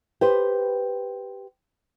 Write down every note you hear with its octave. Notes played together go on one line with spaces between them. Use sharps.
G4 B4 C5